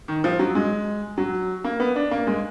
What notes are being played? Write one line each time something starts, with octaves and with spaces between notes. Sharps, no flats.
D#3
F3
F#3
G#3
F#3
A#3
B3
D4
A#3
G#3